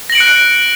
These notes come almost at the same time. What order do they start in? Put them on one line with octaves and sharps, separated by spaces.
A#6 F#7 D7 C#7 F#6